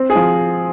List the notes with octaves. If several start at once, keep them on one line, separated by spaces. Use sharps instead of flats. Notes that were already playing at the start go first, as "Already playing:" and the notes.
Already playing: C4
G#4
F3